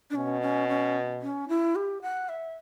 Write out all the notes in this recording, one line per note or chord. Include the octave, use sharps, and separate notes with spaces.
D4
B2 C#4
C#4
C#4
C#4
E4
G4
F#5
E5